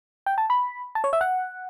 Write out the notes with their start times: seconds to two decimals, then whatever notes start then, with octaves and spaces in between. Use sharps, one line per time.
0.26 G5
0.38 A5
0.50 B5
0.95 A5
1.04 C#5
1.13 E5
1.21 F#5